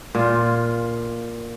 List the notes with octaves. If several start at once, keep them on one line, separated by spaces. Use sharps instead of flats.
A#2 F4